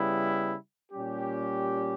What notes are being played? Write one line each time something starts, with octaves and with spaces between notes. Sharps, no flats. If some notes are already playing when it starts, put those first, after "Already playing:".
Already playing: C#3 G3 B3 E4
A#2 G3 C#4 G4